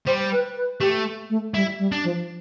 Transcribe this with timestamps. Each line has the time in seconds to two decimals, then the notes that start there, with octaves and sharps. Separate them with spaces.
0.07 G3 C5
0.32 B4
0.57 B4
0.81 A3 G4
1.30 A3
1.54 G3 E4
1.79 G3
1.92 D4
2.04 F3